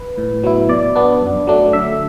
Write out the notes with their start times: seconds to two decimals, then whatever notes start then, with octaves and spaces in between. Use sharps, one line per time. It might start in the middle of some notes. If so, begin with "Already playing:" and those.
Already playing: B4
0.18 A2
0.43 F#3 B3 E4
0.69 B2 D5
0.95 B3 D4
1.21 F#2
1.47 F#3 A3 D4
1.73 D3 E5